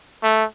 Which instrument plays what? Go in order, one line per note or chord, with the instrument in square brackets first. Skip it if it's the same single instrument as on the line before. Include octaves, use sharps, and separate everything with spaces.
[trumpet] A3